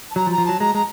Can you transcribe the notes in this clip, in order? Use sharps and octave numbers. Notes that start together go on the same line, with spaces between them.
A5
F#3 A#5
F3
A#5
F3
F#3 A5
G#3 A#5
G#3 A#5